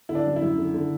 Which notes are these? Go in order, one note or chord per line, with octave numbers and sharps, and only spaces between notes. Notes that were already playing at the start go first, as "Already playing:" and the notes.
D3 E4
D4
F#2
E4
F#2
D3
D3